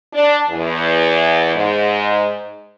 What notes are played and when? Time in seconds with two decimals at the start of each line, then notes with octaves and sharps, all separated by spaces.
0.14 D4
0.49 E2
1.55 G#2